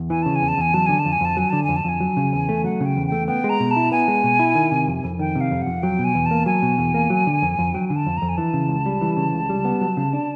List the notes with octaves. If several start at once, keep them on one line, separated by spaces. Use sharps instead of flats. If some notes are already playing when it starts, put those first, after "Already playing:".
Already playing: E2
E3 G#5
C#3 A5
G#5
E2
A5
E2 G#5
F#3 A5
D3 G#5
A5
F2
G#5
F2 A5
F#3 G#5
D3 A5
G#5
F2
A5
F2 G#5
F#3
C#3
E2
A3
F#3 F#5
C#3
G5
E2
A3 G5
B3 G5
G#3
A#5
B2
A5
E4
B3 G#5
G#3
B2
E4
D#3
C3
F2
F2
D#3 G5
C3
F5
F2
F2 F#5
F#3 G5
B2
G#5
E2
A5
A#3
F#3 G#5
B2
E2
A#3
F#3
D3
F2
F2
F#3 G5
G#5
D3
A5
F2
F2 A#5
G#5
E3 A5
C#3
C#2
G3
E3
C#3
C#2
G3
B3
F#3
C#3
D4